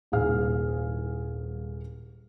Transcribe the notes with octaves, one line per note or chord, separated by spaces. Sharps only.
D#1 C2 G#2 G#4 F5 F6